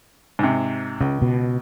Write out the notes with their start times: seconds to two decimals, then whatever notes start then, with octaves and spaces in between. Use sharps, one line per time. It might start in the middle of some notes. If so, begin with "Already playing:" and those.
0.39 G#2 C3
1.01 C#2 C#3
1.22 B2